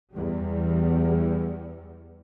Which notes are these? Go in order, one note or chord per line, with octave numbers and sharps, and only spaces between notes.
E2 G3